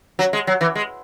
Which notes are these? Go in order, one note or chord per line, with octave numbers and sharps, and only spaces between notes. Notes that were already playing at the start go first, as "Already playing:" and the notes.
F#3
G#3
F#3
E3
G#3